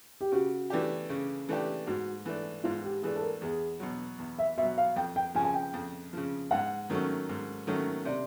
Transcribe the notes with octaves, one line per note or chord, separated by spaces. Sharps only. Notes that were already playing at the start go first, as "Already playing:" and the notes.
G4
C#3 F#4
E3 A3 D4 G4
C#3
E3 A3 D4 G4
G#2 F#4
E3 A3 D4
G#2 F4
G4
E3 A3 D4 G#4
A4
A#4
E2 G#4
B2 F#3
E2
E5
B2 E5
F#3
F5
F2 G5
G5
C#3 F3 G#5
G#5
G5
F2
C#3 F3
G#2 F#5
D#3 F#3 A3 C#4
G#2
D#3 F#3 A3 C#4
C3 D5